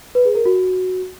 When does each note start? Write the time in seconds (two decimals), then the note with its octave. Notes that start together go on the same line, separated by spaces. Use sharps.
0.15 B4
0.25 G#4
0.35 A#4
0.45 F#4